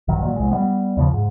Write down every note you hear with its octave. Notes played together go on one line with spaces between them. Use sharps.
A#1 G2 D#3 F#3
A#2 F#3
C2 G#3
G3 G#3 B3
D#2 C#3 F3
G#2